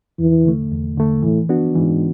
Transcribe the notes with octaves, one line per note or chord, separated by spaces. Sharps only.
E2 E3
D3 A3
E2
D3 A3
A2 E3
B3 D4 F#4
G#2 E3